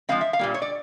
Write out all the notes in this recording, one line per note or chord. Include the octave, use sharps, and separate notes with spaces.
F3 G#3 C4 F5
E5
F5
A#2 G3 A#3
C#5
D5